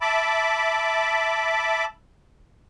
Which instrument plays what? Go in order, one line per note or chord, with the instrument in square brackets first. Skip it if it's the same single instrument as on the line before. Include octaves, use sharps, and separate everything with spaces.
[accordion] E5 A5 B5 D6